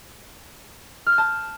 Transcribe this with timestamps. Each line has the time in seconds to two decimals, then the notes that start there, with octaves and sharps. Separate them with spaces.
1.06 F6
1.12 G6
1.18 A5